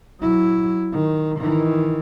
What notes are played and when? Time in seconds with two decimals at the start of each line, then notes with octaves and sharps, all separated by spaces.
0.21 F#3 E4
0.93 D#3
1.40 D#3 E3